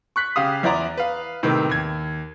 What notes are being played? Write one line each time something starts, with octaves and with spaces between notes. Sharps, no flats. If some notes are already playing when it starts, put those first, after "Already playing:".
C#6 F#6 B6
C#3 G4 F5 D#6
E2 E4 C5 D5 A#5
B4 F5
A2 C3 D#3 B3
D#2 G#6